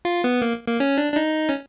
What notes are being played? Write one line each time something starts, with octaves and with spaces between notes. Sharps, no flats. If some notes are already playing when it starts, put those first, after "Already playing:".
F4
B3
A#3
A#3
C#4
D4
D4
D#4
C#4